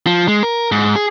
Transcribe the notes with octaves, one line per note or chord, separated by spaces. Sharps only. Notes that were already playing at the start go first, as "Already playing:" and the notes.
F3
G#3
A#4
G#2
G#4